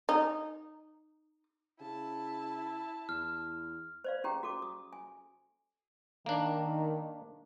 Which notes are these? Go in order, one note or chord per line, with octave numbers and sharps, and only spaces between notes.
D#4
C#3 E4 A5
E2 F6
C5 D5 F5
C#4 G4 G#4 G5 A#5
F#4 A4 D6
D#6
G#5
D#3 A#3 D4